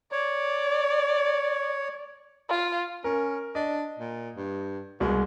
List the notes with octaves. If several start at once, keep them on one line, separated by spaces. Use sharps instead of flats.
C#5 D5
F4
C#4 A#4
D4 D#5
A#2
G2
C2 B2 G#3